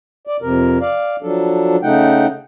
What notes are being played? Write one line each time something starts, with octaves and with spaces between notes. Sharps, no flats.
D5
F2 C3 A#4
D5 F5
F3 F#3 D4 A4
C#3 A3 D#4 F#5 G5